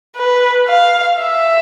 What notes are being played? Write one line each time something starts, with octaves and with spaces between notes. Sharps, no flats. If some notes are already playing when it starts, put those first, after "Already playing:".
B4
F5
E5